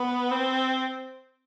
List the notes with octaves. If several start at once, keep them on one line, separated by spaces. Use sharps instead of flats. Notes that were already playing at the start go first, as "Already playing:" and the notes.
Already playing: B3
C4